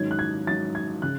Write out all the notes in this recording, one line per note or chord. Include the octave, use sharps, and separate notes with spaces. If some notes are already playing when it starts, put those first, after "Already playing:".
Already playing: G#2 D#3 F#3 C#4 G#6
F#6
G#6
G#2 D#3 F#3 C#4 A6
G#6
C#3 F#6